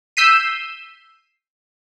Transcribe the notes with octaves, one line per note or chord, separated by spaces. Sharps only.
E6 G6 B6 C7 D#7